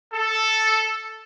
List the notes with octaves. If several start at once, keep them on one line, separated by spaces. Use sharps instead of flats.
A4